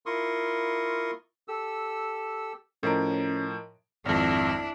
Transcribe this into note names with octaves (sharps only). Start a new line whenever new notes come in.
E4 F4 A#4 C6 C#6 D#6
G4 A4 E6
A2 F3 C#4 A#4 D#5 A#5 D7
G#1 F2 D4 E4